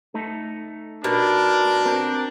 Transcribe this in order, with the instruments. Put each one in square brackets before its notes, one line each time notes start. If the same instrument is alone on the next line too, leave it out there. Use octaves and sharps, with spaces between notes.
[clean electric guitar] A3 D#4 A4
[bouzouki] B2 [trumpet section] D4 [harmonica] A#4
[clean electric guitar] C4 A#4